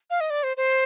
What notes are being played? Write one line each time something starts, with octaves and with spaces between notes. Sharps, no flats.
F5
D#5
D5
C5
C5